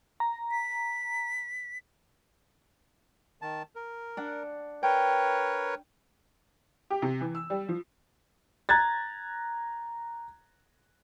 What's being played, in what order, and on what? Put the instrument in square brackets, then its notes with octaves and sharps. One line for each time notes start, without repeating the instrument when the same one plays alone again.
[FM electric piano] A#5
[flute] B6
[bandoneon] D#3 A5
A#4
[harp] D4 F#5
[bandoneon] A#4 B4 C#5 [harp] G5
[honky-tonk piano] G4
C3
E3
E6
G3
F3
[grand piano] A#5 F#6 G#6 A6